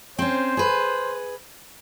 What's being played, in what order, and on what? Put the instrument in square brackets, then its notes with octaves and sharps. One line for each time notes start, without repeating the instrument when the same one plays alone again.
[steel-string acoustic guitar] C4 C#4 [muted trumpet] C5
[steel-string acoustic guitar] G#4 B4